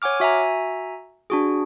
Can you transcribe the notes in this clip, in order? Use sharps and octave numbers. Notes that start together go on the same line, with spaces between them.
C#5 F#5 G#5 D6 F6
F#4 E5 G#5 A#5
D4 F#4 G#4